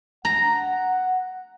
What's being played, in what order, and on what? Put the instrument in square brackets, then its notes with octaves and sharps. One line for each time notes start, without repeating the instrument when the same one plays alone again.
[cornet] F#5 [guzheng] A#5